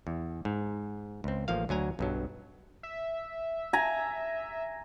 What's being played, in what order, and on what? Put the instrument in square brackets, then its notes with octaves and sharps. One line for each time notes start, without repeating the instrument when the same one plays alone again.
[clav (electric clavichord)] E2
G#2
C#2 C4
A1 F3 A#3 F5
D2 F#3 G#5 A#5
B1 G2 F#3
[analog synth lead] E5
[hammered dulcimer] G#5 A#5